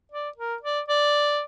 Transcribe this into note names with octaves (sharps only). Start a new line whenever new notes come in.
D5
A#4
D5
D5